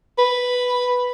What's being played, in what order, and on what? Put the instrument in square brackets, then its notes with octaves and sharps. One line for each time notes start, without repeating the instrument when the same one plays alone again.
[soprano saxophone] B4